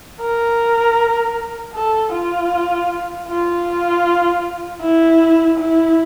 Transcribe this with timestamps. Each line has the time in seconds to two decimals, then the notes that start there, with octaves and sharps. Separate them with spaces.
0.21 A#4
1.74 A4
2.12 F4
3.29 F4
4.81 E4
5.58 E4